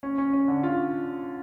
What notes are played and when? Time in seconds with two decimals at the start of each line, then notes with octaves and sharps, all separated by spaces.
0.03 C#4
0.18 C#4
0.33 C#4
0.48 D3
0.63 F4